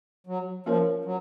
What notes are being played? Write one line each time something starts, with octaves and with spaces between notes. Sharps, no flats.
F#3
F3 A#3 C#4 F4 A#4 C#5
F#3